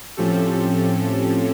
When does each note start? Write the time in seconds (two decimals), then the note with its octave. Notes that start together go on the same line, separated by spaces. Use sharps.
0.17 A2 F3 C4 C#4 G4 A4